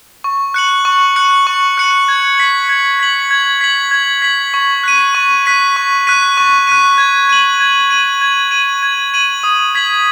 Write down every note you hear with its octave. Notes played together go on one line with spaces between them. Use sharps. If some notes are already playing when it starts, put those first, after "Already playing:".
C#6
F#6 C#7 F#7
C#6
F#6 C#7 F#7
C#6
F#6 C#7 F#7
G#6
B6 F#7
G#6
B6 F#7
G#6
B6 F#7
G#6
B6 F#7
C#6
F#6 B6 D#7
C#6
F#6 B6 D#7
C#6
F#6 B6 D#7
C#6
F#6 B6 D#7
G#6
D#7 F#7
G#6
D#7 F#7
G#6
D#7 F#7
G#6
D#7 F#7
D#6
G#6 B6 F#7